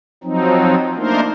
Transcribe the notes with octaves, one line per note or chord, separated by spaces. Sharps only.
F3 F#3 C4 D#4
A3 A#3 D4 D#4 A#4 C5